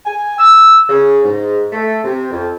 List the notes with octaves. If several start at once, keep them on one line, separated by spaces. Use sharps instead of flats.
G#5
E6
C#3
G#2
A3
C3
F2